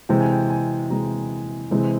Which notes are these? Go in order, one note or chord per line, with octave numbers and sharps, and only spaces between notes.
C3 E3 G#3 G5
G#5
G5
G#5
C3 E3 G#3 A#5
C3 E3 G#3 C4